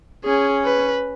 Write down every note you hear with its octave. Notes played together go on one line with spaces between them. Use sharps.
C#4 G#4
B4